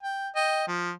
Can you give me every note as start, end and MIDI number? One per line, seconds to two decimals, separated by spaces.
0.03 0.28 79
0.36 0.64 75
0.36 0.64 79
0.68 0.91 53